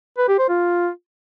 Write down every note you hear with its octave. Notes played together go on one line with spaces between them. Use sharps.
B4
G4
C5
F4